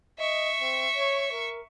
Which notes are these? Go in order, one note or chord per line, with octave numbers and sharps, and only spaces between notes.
D#5 E5 C#6
C4
C#5
A#4